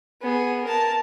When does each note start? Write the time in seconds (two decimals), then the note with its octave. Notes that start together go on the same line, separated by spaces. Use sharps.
0.22 B3 G#4
0.64 A#4 A5